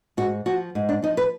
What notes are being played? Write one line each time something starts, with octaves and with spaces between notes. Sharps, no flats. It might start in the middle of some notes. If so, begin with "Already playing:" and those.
G#2 F#4
F3 F#4
G#2
D4
F3 D#4
B4